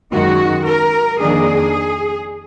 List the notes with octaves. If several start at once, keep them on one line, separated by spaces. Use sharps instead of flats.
F#2 D#3 G#3 F#4
A#4
F2 D#3 A#3 D4 G#4